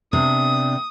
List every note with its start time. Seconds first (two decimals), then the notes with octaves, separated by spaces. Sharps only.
0.13 C3 B3 D4 D#6